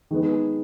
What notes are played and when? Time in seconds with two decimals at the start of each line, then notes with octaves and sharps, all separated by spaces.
0.11 D#3 G#3 B3